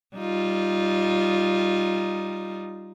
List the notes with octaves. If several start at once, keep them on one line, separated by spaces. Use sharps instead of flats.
G3 D#4 F4